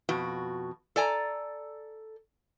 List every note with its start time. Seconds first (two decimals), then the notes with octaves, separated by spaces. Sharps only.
0.09 F2 B2 F#4
0.96 A4 D5 G#5 A#5